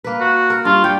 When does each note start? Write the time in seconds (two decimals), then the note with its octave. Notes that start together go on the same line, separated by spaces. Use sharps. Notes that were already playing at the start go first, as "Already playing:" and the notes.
0.04 A#3 B4
0.20 F#4
0.50 A#4
0.65 G2 F4
0.84 G3 G5